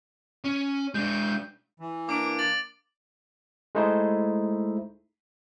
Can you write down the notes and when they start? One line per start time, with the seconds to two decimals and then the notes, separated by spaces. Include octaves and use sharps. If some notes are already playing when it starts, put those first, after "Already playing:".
0.44 C#4
0.94 G#3 D4 G6
1.80 E3
2.09 A#3 D4 D6 D7
2.39 A6 F#7
3.75 G#3 A3 D#4 E4 C5